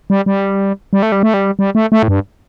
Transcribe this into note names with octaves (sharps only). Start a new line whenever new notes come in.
G3
G3
G3
A3
G3
A3
G3
G3
A3
A3
A2
G2